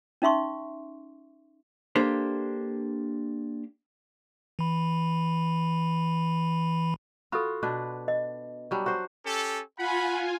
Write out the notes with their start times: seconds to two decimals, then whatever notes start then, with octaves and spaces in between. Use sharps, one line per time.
0.22 C#4 D#4 E5 C6 C#6
1.96 A#3 D4 G4 A4 C5
4.59 E3 B5
7.32 F4 F#4 A4 B5
7.63 B2 D4 B4
8.08 D#5
8.71 F#3 G3 D4
8.86 F#4 C5
9.26 C#4 G4 A4
9.78 F4 F#5 G#5 B5